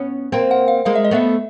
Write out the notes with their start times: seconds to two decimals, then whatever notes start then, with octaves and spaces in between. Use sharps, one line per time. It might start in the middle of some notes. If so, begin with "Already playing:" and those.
Already playing: B3 C#4
0.32 A#3 C4 G5
0.51 F#5
0.68 F5
0.85 G#3 A#3 F5
0.95 E5
1.05 D#5
1.11 A3 B3 E5